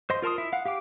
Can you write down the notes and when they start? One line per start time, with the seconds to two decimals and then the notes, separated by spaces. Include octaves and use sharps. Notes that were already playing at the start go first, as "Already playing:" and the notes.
0.10 C5 D#5 C6
0.22 F4 A#4 A5 C6 D#6
0.38 E4 E5
0.53 F5 F#5
0.65 G4 F5 G5 D6